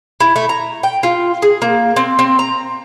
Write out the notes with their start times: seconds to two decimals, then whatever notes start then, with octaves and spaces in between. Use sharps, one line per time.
0.20 E4
0.36 A3
0.49 A#5
0.83 G5
1.03 F4
1.42 G#4
1.62 A#3
1.96 C4
2.19 C4
2.39 A#5